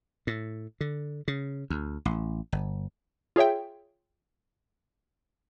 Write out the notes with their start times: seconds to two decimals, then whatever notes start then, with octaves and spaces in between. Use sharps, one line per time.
0.27 A2
0.81 D3
1.28 C#3
1.70 D2
2.05 A1
2.52 G1
3.36 F4 G#4 C#5 E5 G5